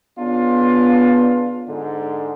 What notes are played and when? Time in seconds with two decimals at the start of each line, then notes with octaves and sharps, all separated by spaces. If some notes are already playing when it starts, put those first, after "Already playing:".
0.19 C#3 B3 D4 F4
1.67 G#2 D3